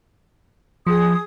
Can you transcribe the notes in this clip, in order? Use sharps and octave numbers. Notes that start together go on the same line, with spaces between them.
F3 G#4 D#6